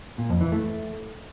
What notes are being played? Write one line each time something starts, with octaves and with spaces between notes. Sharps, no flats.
A#2
F2
E3
A3